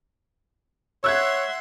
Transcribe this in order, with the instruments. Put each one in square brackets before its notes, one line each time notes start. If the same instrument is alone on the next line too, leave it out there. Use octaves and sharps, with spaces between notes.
[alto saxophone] C#5 [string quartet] E5 F#5 C6 [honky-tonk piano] E6 F#6 G#6